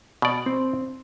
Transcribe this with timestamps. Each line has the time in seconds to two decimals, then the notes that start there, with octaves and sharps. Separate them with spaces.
0.22 B2 D5
0.46 C4